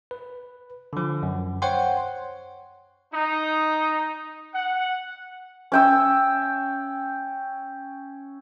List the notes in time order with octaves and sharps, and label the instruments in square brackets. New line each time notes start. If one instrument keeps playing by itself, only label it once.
[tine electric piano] B4
D3 F3
F#2
C5 C#5 F#5 G5 C6
[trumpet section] D#4
F#5
[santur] C#4 G5 E6